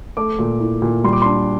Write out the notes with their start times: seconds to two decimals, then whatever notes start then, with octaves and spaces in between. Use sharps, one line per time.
0.17 A3 D6
0.39 A#2
0.60 E4
0.82 A#2
1.04 G3 C6
1.13 D6
1.22 D4 C6